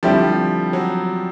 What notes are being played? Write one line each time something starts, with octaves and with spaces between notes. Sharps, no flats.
D3 F3 G3 C4 E4 G4
F#3